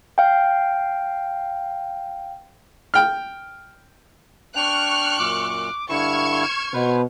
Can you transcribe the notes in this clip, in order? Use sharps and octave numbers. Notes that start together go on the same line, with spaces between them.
F5 G5
G5 F6
D4 G5 C#6 F6 F#6 F7
F#2 A#2 D6
G2 D3 E4 C#6 F6 G#6 E7
B2 B4 C5